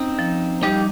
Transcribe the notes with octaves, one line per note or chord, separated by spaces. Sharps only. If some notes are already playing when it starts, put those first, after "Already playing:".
Already playing: C4 C#4 D#4
F3
G3 D#4 G4